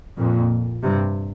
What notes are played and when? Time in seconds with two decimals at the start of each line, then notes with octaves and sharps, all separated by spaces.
0.18 F2 A#2
0.83 G2 C3